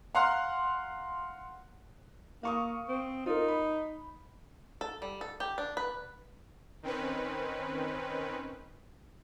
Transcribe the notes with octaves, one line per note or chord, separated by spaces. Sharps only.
F5 F#5 A#5 C6 F6 F#6
A#3 F5 C#6 D#6
C4
D#4 F4 A#4
B5
A4
G3
A4
G4
D4
B4
D#3 C4 C#4 B4